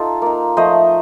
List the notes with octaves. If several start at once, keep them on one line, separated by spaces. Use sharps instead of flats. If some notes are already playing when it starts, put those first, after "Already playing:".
Already playing: D#4 F4 A4
A#3 D#4
F3 A3 D#4 C5 D#5